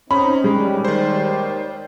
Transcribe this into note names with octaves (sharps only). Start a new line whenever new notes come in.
C4 C#4 D#4 B5
D#2 G3 G#3
D#3 C5